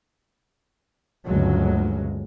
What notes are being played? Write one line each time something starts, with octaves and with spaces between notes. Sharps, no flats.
G1 D2 C#3 F#3 G#3